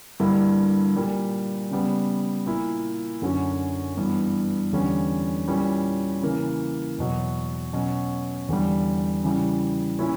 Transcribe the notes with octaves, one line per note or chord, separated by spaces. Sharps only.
G2 D3 G3 A#3 E4
A#2 G3 A#3
C#3 G3 B3
A#2 A#3 E4
F#2 D3 F#3 C#4
G2 E3 B3
E2 D3 G3 C#4
A#2 G3 C#4 E4
C#3 E3 A#3
E2 B2 F#3
B2 F#3 C#4
E2 D3 G3
C#3 E3 G3
A#2 A#3 C#4 E4